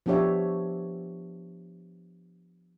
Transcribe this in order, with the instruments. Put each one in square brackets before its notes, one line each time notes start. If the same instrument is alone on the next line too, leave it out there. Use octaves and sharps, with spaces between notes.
[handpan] F3 B3 D4 G4 C#5 E5